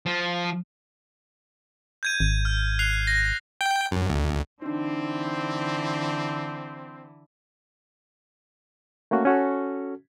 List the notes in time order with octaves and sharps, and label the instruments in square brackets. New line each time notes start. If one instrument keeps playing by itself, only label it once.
[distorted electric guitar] F3
[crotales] G6 G#6 D#7
[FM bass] G#1
[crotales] F6
F#6 C7 F7
A#6
[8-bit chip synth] G5
F#2
D2
[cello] D3 E3 [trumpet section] C4 [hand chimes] D4 D#4
[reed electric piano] A3 A#3 C#4 F#4
C#4 F#4 A4